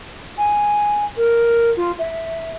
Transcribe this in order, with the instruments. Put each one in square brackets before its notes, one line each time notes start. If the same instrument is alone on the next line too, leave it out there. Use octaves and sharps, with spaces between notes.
[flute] G#5
A#4
F4
E5